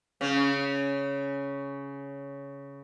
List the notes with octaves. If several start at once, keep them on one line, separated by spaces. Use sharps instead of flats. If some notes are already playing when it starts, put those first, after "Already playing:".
C#3 C#4